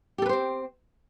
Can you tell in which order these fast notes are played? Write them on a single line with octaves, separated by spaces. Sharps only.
G4 A4 B4 C5 C4